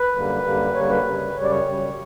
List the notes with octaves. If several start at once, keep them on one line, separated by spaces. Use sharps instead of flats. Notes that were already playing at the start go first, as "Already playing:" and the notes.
Already playing: B4
F#2 D3 G3 A#3
F#2 D3 G3 A#3
F#2 D3 G3 A#3 C#5
B4
F#2 C#3 G3
F#2 C#3 G3 C#5
D5
C#5
F#2 C#3 G3